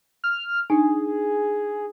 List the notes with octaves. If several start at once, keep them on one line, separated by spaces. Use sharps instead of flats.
F6
D4 D#4 G#4